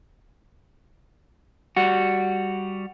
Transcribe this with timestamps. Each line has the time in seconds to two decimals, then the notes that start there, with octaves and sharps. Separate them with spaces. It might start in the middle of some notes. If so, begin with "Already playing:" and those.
1.77 G3 F#4